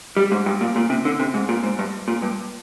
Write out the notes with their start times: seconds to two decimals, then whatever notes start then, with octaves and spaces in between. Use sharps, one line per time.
0.17 G3
0.32 G#2
0.46 G2
0.61 A#2
0.76 A#2
0.90 C3
1.05 D3
1.20 C3
1.34 G#2
1.49 A#2
1.63 G#2
1.79 G2
2.08 A#2
2.22 G2